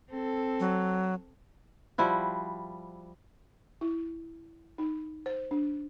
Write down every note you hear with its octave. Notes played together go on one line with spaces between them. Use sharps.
C4 A4
F#3
F3 G3 E4 F#4
E4
D#4
C5
D4